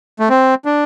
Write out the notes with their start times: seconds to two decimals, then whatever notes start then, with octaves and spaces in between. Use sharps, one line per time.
0.20 A3
0.30 C4
0.65 D4